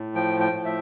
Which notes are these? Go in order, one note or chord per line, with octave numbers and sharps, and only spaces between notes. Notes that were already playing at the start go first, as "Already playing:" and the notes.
Already playing: A2
F3 G5
G5
A2
E5